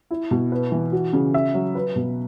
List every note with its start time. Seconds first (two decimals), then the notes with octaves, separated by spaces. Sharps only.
0.11 E4
0.31 B2
0.52 B4
0.72 E3
0.92 F#4
1.13 C#3
1.34 E5
1.54 F#3
1.75 B4
1.96 B2